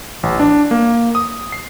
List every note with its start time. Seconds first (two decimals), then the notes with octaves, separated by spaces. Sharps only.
0.23 A1
0.40 D4
0.71 A#3
1.15 D#6
1.52 C7